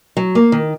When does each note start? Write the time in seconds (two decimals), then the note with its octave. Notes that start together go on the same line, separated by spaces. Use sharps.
0.17 F#3
0.35 A#3
0.52 D#3